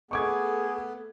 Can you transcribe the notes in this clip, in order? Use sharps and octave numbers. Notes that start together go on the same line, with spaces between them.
A3 B3 G#4 A4 C#6 D6 G#6